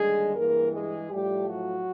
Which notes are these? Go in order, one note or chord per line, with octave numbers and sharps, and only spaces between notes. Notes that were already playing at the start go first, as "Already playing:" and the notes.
Already playing: D#2 D3 G3 G#3 G#4
G2 E3 G#3 A#3 A#4
G#3 G#4
A2 F3 G3 A3 G4
F#3 F#4